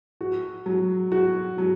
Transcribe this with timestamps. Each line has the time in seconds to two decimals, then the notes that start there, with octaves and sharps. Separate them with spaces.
0.21 F#4
0.66 F#3
1.12 F#4
1.58 F#3